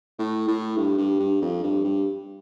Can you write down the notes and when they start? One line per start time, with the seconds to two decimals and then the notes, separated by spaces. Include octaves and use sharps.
0.19 A2
0.48 A2
0.77 G2
0.98 G2
1.20 G2
1.42 F2
1.63 G2
1.85 G2